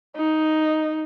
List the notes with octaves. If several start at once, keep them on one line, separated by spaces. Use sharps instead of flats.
D#4